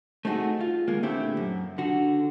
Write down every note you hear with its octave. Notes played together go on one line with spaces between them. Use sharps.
A3 C4 D#4 F4 F#4 G#4
F4
D#2 G#3 A#3
A#2 D3 A3 C4 E4 G4
F#2
D3 F#4